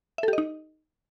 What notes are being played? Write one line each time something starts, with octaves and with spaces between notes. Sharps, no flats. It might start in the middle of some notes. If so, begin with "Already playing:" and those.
D#4 G4 A4 D#5 E5